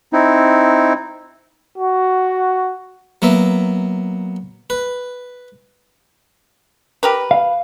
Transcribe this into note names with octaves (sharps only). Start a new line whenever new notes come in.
C4 D#4 E4
F#4
F#3 A#3 B3 E5
B4
G4 A#4 B4
F5